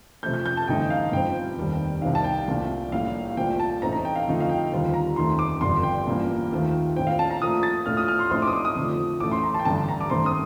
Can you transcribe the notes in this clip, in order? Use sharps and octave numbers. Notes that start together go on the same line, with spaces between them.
F2 C3 F3 A3 G6
G6
G6
A5
A1 G2 D3 A3 D#4 G5
F5
G2 F3 C4 G5
F1 D#2 D#3 G3
C2 C3 D#3 F5
A5
G5
C2 A#2 A3 D4 F4
A#1 A2 G3 A#3 F5
C2 A#2 A3 C4 G5
A5
A1 A2 A3 C4 D#4 A#5
A#5
G5
F5
F2 D3 F3 A3 D#4
F5
G5
D#2 D3 G3 C4 F4
A#5
F1 D#2 D#3 A3 C6
D6
G1 F2 D3 G3 D4 C6
G5
A1 G2 F3 A#3
D#2 D#3 A3 C4 F4
A#1 A2 F3 C4 G5
F5
A5
A#5
A#2 F3 A3 D#6
A6
A2 A3 D4 F4 F6
D#6
F6
C6
A#1 A2 A3 C4 D#4 C6
D6
D#6
D6
D#6
F2 D3 F3 A3
A1 A2 A3 D6
C6
A#5
A5
G5
A1 G2 D3 A3 D4 A5
A#5
D6
G2 D#3 A3 C4 C6
D#6